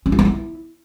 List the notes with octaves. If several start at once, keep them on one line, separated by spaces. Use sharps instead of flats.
C#4
F4
B3
E4